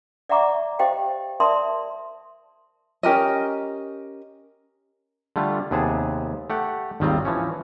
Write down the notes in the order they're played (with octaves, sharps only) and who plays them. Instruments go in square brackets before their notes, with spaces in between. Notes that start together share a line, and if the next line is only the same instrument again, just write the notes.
[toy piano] D5 E5 F#5 A#5 C#6 D6
G4 C5 D#5 F5 G5
A#4 D5 E5 A5 C6 D#6
[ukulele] C#4 G4 A#4 D#5
[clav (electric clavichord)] D3 G3 A3 F4
D#2 C3 B3 G#4 A5
A3 G4 F#5
G#1 D#2 D#3 G3 C4 F4
E3 F3 C#4